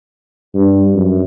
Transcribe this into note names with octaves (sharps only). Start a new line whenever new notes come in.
G2
F#2